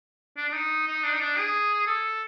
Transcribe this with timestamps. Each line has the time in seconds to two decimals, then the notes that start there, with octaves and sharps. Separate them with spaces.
0.37 D4
0.49 D4
0.53 D#4
0.87 D#4
1.04 D4
1.13 D#4
1.21 D4
1.37 G#4
1.87 A4